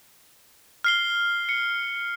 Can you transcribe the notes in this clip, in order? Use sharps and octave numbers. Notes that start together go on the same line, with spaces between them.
F6 C7 G7
C#7